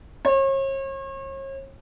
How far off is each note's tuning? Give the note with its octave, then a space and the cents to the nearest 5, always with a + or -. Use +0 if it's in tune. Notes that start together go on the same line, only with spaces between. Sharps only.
C#5 -40